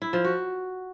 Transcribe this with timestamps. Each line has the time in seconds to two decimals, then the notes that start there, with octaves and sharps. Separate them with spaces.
0.02 E4
0.13 F3
0.25 F#4